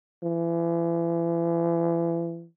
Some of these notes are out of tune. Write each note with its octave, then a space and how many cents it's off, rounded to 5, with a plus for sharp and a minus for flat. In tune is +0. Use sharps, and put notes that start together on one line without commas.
E3 +35